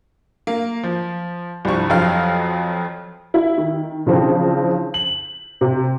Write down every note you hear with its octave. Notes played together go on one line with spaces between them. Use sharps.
A#3
F3
C2 G2 F3 C#6
F2 F3 F#3 F5 F6
E4
D#3
C#3 E3 F3 C4 D4
F#7
C3